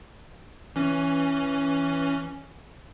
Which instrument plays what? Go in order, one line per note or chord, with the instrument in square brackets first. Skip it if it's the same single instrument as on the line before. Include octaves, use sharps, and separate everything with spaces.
[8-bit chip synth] E3 C#4